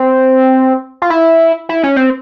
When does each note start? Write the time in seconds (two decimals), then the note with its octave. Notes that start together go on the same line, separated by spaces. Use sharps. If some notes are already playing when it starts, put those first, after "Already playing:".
Already playing: C4
1.02 F4
1.10 E4
1.69 E4
1.83 C#4
1.96 C4